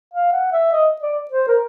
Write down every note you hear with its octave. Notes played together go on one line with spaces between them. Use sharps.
F5
F#5
E5
D#5
D5
C5
A#4